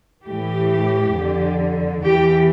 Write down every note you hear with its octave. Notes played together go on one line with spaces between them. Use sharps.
A2 E3 G4
F2 D3
E2 E3 G4